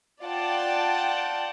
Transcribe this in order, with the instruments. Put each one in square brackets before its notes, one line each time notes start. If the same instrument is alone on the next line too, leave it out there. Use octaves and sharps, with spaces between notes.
[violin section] F4 D5 F#5 G5 A5